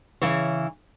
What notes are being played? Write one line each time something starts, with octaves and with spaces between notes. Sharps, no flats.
C#3 E3 C#5